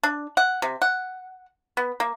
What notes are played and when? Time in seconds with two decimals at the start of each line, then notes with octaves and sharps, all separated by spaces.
0.03 D4
0.37 F#5
0.62 C3
0.82 F#5
1.77 B3
2.00 A#3